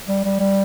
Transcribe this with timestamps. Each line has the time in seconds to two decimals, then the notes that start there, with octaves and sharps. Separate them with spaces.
0.08 G3
0.25 G3
0.40 G3